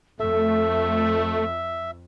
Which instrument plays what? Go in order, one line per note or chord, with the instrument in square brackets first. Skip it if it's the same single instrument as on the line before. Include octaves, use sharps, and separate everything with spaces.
[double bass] F2 [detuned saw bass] A3 [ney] A4 [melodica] E5